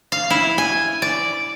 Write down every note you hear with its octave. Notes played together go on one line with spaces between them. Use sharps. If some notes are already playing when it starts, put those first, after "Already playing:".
F5
E4
G#5
D5